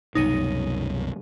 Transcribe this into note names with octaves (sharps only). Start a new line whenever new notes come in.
C2 F#2 B2 D#4 C#5 D#7